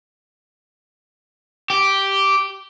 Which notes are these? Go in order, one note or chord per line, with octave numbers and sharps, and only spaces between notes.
G4